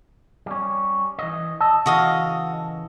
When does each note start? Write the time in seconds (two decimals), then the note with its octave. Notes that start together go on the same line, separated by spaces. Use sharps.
0.46 G3 C#4
1.19 E3 D#5
1.61 D#5 A5 E6
1.86 C#3 E3 F#4 A4 D#5 F5